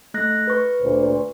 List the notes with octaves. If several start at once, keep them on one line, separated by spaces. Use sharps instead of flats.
A3 F#6 A#6
B4 C#6
D2 A#2 C5